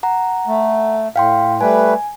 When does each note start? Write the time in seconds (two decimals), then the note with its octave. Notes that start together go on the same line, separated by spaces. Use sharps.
0.03 F#5 A#5
0.48 A3
1.16 A2 F5 G5 C6
1.61 G3 A3 B4 G#5